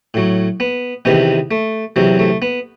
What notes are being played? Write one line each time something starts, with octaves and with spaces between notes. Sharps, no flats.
A2 F#3
B3
E2 C3 D#3 B3
A3
E2 C3 F#3
A3
B3